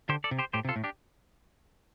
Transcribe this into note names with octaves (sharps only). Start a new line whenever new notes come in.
D3 G4 C5
A4 D5
C3
G4 C5
A2 G4 C5
C3
F4 A4
A2
D4 G4